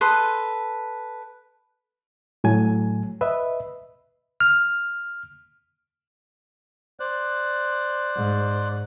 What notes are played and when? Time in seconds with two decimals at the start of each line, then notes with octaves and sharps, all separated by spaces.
0.01 A4 B4 C6 D#6
2.44 A2 F#3 G#5
3.21 B4 D#5 E5
4.40 F6
7.00 C5 D5 F#6
8.15 G#2